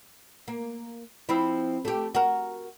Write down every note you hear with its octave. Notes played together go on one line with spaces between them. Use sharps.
A#3
F3 C4 E4
A3 G4
F#4 A#4